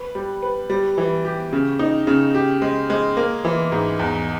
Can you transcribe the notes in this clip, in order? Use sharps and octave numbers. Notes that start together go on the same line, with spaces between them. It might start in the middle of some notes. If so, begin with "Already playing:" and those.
Already playing: B4
G3
B4
G3
E3
G4
C#3
D#4
C#3
G4
G#3
G#3
A#3
E3
G#2
E2